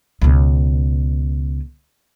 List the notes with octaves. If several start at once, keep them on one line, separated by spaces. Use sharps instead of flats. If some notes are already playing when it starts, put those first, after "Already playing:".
C#2 B2